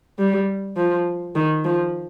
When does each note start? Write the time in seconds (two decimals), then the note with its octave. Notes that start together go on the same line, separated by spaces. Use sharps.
0.19 G3
0.76 F3
1.35 D#3
1.65 F3